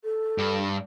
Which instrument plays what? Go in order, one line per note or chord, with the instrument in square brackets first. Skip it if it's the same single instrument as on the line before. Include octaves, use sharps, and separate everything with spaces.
[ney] A4
[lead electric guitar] G2